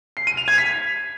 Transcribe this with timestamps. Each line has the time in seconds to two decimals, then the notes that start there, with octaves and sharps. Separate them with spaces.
0.17 C7
0.27 D#7
0.37 F7
0.48 G#6
0.58 B6